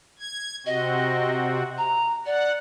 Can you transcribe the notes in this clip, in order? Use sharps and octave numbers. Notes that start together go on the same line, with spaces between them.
G#6
C3 C4 F#4 D#5
A#5
D5 F#5